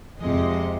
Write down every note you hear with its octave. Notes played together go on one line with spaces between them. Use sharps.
F2 C3 F3 G#3 D#5